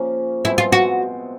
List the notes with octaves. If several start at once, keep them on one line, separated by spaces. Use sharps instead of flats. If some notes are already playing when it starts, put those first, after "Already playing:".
Already playing: C#3 F3 A#3 C#4
B2 G#3 C4 E4
F4
F#4